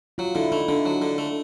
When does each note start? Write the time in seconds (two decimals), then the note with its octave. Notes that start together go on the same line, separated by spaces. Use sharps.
0.18 F#3 F4
0.35 D3 E4
0.52 A3 D#4
0.68 D3 D4
0.86 F#3
1.02 D3
1.18 A3